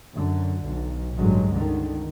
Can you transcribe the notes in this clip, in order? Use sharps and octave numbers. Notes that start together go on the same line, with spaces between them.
F#2 D3
B1
A1 G2 D3 F#3 G#3
C#2 D3 D#3